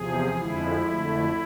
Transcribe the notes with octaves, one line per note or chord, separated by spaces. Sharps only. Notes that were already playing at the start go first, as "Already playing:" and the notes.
Already playing: E2 C3 F3 G#4
F2 D3 F3 G#3 E4
F2 D3 A3